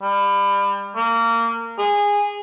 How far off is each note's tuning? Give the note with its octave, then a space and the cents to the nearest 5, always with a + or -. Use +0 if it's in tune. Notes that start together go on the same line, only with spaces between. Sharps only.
G3 +30
A#3 -20
G#4 -20